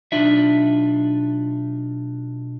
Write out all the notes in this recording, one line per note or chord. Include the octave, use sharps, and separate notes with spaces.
B1 D4 D#4 F4 E5